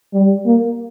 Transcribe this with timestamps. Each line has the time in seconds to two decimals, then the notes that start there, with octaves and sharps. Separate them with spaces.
0.13 G3
0.45 A#3